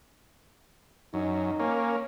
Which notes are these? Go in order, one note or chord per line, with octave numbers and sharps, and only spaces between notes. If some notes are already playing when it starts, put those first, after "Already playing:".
F#2 D#4
A#3 C#4